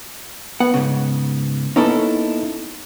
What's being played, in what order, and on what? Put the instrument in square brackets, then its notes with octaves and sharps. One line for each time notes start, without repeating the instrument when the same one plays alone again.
[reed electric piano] B3 [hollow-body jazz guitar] F#5
[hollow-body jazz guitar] G#2 C#3
[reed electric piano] A#3 B3 C#4 [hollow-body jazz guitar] D#4 E4 A4